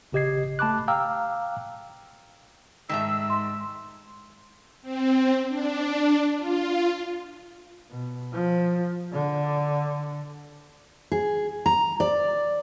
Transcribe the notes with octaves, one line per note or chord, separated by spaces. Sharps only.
G#1 C#3 G4 D#5 G#6 C7
A3 A5 B5 D6 F#6
F5 G5 A#5 D6 E6 F6
G#2 D#3 A3 E5 E6
C6
C4
D4
F4
B2
F3
D3
G#4
A#5
D5